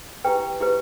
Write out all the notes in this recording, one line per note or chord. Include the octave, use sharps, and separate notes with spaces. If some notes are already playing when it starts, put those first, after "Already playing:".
E4 G4 B4 G5
E4 G4 B4